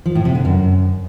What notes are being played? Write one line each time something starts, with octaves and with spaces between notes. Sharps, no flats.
F3
A2
C3
D3
F#2